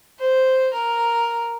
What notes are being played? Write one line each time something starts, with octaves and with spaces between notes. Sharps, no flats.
C5
A#4